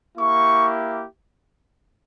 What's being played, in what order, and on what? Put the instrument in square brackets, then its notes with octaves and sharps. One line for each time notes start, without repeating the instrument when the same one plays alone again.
[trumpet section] A#3 E4 G4 C#6